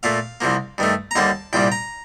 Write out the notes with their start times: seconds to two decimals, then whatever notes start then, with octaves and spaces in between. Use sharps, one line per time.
0.03 A#2 A3 F5
0.41 C2 C3 F3 A#3
0.78 G2 D#3 A3
1.11 A#5
1.16 D#2 D3 G3 A#3 A5
1.53 C2 A#2 G3 G5
1.72 A#5